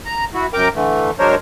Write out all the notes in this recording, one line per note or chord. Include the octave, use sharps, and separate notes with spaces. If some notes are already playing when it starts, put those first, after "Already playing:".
A#5
E4 F#4
F#2 A#4 G5 A#5 D6
D3 E3 A3
F#3 G#3 D4 A#4 C5 C#5